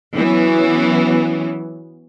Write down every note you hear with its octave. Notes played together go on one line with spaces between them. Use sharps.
E3 F#3 B3 C#4